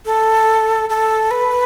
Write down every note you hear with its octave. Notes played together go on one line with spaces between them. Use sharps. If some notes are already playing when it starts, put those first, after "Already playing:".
A4
A4
B4